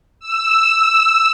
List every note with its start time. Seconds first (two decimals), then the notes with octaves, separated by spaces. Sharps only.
0.20 E6